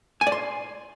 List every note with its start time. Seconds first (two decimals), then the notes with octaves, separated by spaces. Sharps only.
0.21 G#5
0.27 D5
0.32 C6